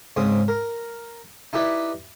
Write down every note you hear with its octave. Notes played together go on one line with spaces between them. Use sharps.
G#2 C#3 C4 D#6
A#4
D#4 E4 G4 B4 D5 E5